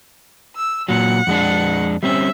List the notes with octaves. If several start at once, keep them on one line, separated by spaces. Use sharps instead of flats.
E6
A#2 F#3 F#5
F2 G#3 D4
G3 C4 C#4 E5